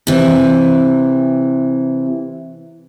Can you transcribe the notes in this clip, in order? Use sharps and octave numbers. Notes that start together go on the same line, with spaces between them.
C3 E3